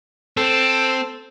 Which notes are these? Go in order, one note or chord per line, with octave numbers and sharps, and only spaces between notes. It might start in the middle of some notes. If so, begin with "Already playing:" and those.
C4 A4